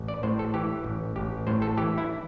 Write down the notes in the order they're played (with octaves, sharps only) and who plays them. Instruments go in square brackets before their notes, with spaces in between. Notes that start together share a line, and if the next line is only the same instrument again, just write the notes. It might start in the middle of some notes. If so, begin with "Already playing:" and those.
Already playing: [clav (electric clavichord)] A1
D5
A2 C5
A4
E3 G4
A1
A1 G4
A2 C5
A4
E3 G4
E4